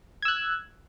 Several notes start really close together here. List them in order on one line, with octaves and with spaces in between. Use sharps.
G#6 E6 F#6